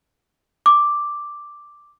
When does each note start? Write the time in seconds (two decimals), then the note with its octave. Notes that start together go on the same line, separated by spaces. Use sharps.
0.66 D6